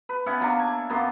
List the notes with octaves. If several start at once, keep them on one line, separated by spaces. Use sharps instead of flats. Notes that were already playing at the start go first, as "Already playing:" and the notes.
B4
B3 C#4 E4 F#5
F#3 A#3 D4
G#5
F#2 A#3 B3 C6